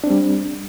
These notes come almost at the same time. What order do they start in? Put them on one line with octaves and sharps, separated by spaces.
D4 C4 G3